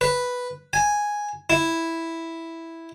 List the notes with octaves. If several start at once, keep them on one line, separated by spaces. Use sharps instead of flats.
B4
G#5
E4